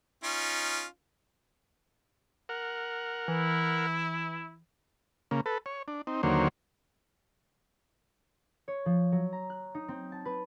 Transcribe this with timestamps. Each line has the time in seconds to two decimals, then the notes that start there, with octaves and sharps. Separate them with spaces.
0.24 C#4 D#4 F4
2.49 A#4 F#5
3.28 E3 E4
5.31 C#3 A#3
5.46 A4 B4
5.66 C#5
5.88 D4
6.07 C4 D#4
6.23 D#2 D3 F#3 A#3 C5 C#5
8.68 C#5
8.86 F3
9.12 F#3
9.33 A#5
9.50 F#6
9.75 D#4
9.88 C4
10.12 A5
10.25 B4